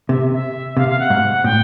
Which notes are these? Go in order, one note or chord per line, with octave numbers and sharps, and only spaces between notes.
C3 E5
E5
C3 F5
F5
F#5
G#2
A2 G5